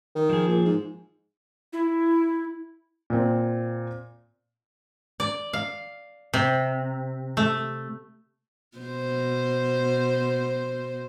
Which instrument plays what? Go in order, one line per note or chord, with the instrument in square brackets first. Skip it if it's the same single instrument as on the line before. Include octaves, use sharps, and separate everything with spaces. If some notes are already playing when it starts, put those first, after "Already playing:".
[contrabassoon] D#3
[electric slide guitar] F3 G#4
[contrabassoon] A#2
G#2
[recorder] E4
[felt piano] A#2 C4
[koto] D5
F5
C3
A3
[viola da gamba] B2 C5